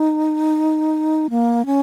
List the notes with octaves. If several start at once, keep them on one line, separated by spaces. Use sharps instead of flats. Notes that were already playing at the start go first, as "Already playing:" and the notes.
Already playing: D#4
A#3
C#4